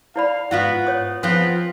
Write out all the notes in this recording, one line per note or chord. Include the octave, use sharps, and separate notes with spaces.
E4 D5 F5 B5
G#2 B3 F4 F#4 F#5
C#5 D#6
F3 B3 C4 F4 G#4 C6